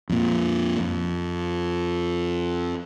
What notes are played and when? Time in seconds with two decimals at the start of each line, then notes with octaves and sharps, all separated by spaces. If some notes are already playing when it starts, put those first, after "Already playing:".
0.09 F2 A#2
0.80 F2